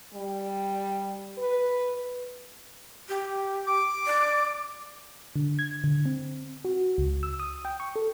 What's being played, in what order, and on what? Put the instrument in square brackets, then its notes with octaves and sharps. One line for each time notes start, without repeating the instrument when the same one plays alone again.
[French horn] G3
B4
[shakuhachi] G4
[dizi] D6
[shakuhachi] D5
[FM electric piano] D3
G#6
D3
C4
F#4
C#2
E6
D#6
G5
C#6
A4